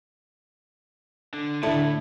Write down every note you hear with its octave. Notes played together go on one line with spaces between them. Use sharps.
D3
A2 D3 D4 E4 A4